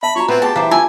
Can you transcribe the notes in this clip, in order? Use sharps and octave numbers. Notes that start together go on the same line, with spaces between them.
E5 A5 B5
F4 F#4 C#5 A#5
B3 C4 E4 B5
G4 G#4 A5
E3 C5 F5 A#5 D6
F4 G#5 A5 E6